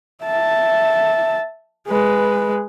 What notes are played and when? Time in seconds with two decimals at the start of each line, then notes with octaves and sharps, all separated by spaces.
0.23 E5 A5
1.87 G#3 B4